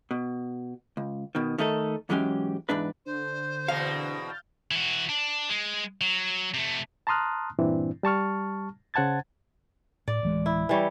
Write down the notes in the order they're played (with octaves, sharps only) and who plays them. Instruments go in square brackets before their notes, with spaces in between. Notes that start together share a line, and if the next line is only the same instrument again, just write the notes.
[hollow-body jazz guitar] B2
C#2
B2 D#3
D#3 A3 D#4 A4
G#2 E3 F#3 G#3 C#4 G4
E2 G#2 D4 B4
[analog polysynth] D3 [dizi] C5
[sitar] E2 B2 C4 [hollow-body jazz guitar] F5
[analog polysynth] F6 G6 A6
[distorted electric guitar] E3 F#4
D4
G#3
F#3
C3 A3
[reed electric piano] A5 A#5 C6 D#6 F6 F#6
G2 A#2 E3 C4 D4 E4
G3 A5 C#6 F6
C#3 C5 F#5 A5 G#6 A6
[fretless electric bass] A2 [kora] D5
[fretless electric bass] D1 E3 G#3
[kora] E4
E3 G3 C#5